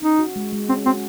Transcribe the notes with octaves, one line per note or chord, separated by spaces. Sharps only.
C#4 D#4
F#4
G#3
G#3
C4 C#4
C4 F#4